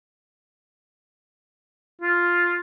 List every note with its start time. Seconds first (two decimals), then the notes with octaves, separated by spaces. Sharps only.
2.01 F4